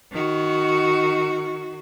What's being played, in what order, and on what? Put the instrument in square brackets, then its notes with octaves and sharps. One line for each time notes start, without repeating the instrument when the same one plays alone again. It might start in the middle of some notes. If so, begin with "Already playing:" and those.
[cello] D#3 F#4